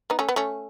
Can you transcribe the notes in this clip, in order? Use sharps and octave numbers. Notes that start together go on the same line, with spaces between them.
B3 D#4
A3 C#4
B3
A3 C#4